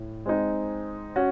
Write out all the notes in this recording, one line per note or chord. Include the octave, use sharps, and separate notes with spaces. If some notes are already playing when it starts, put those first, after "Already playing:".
Already playing: A2
G#3 C4 D#4
C#4 F#4